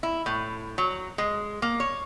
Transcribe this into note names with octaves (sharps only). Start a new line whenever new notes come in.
E4
A2
F#3
G#3
A#3
C#5